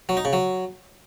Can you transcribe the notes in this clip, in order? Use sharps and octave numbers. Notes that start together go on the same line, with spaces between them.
F#3
D#4
C#3
F#3